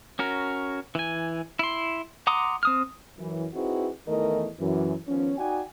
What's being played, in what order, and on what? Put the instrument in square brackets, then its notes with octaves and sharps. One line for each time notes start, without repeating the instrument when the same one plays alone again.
[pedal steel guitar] C#4 F#4 A#4
E3 G#5
E4 C6
F#5 A#5 C6 D6 D#6
C4 D#6 F6
[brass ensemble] F#2 E3
C4 D#4 E4 F#4 G#4 B4
E2 D#3 E3 A3 A#4 D#5
F#2 E3
D#3 F3 B3 C#4
D#4 F#4 D5 G5 G#5